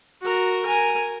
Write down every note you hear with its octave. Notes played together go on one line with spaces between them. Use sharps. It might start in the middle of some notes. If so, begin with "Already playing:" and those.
F#4 A#4
A#4 G#5